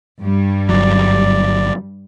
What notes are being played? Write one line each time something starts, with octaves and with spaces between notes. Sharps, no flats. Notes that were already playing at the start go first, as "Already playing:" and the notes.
G2 G3
G1 F#3 D5